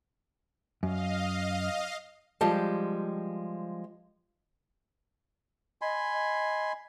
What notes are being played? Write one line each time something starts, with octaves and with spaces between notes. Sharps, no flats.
F#2 D#5 F5
F3 G3 G#3 G4 A5
D#5 G#5 B5 C6
D#5